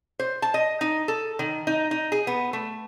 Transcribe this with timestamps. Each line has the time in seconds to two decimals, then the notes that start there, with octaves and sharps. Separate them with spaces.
0.19 C5
0.42 A5
0.54 D#5
0.81 D#4
1.08 A4
1.39 D#3
1.67 D#4
1.91 D#4
2.12 G#4
2.27 B3
2.53 A3